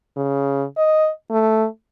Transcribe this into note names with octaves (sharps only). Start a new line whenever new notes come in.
C#3
D#5
A3